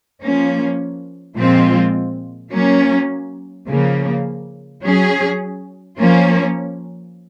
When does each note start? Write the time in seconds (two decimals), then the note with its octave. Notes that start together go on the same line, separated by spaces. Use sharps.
0.21 F3 A#3 C#4
1.37 A#2 F3 G#3 C4 F4
2.52 F#3 A#3 C#4
3.67 C#3 F3 A#3
4.82 F#3 C#4 G#4
5.98 F3 A#3 C#4